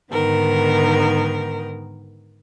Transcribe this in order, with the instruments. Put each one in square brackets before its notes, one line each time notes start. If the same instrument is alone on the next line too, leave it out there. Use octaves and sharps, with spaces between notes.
[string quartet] G#2 D3 D#3 B3 A#4